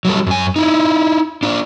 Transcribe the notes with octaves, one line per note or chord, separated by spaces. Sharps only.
F#3 G3 A4
F#2 G#5
D#4 E4
D4 F4